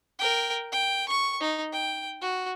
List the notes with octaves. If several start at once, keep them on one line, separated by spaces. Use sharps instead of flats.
A#4 G5
G5
C#6
D#4
G5
F#4